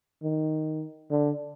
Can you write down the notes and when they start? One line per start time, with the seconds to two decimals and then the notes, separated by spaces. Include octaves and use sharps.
0.23 D#3
1.11 D3